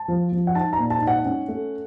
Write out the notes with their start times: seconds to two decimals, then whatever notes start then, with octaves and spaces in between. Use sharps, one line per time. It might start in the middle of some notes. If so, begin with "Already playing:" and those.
Already playing: A5
0.08 F3
0.32 F3
0.47 F#5
0.55 D#4 A5
0.73 A#5
0.79 A#2
0.90 A5
1.01 D#4
1.07 F#5
1.25 C#4
1.48 A3